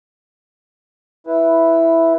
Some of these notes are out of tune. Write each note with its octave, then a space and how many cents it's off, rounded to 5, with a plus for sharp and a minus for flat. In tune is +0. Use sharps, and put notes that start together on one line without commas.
E4 +0 B4 +0